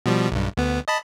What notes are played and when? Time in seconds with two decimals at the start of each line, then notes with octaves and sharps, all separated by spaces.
0.06 B2 F3 G3
0.32 B1 G2
0.57 D2 B3
0.88 D#5 A5 B5